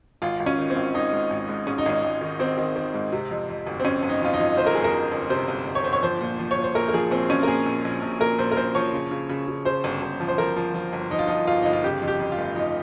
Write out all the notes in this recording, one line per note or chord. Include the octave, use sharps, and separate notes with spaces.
G#1 F4
G#1
C#4
D#3
C4
G#1
G#1 D#4
G#2
G#1
G#2
G#2 C#4
D#4
G#1 C#4
G#1
D#3
D#3 C4
D#3
D#3
G#2
C3
F2
F2
G1
C4
F2 C#4
G1
D#4
F2 F4
D#4
F2
G1 C5
A#4
G1 G#4
A#4
G1
G1
C3 C5
G1
G1
C#5
G1 C5
C#5
F3 C5
A#2
F3
C#5
A#2
C5
A#1 A#4
A#4
F3 G#4
A#1 C4
F3 C#4
A#4
A#2 G#4
A#1
A#1
A#1
A#2 A#4
A#1 C5
A#4
A#1 C5
F3 C#5
C#3
C#3
C#3
C#3
C#3 C5
G1
G1
F3
C5
F3 A#4
F3
F3
G1
F3 D#4
F4
F3 D#4
G1 F4
G1 D#4
F4
C#3 G4
F2
G4
F2
F4
F1
F2 D#4